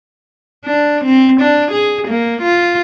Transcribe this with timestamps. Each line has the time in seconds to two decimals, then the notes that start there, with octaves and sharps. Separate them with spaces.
0.66 D4
1.05 C4
1.41 D4
1.72 G#4
2.08 A#3
2.42 F4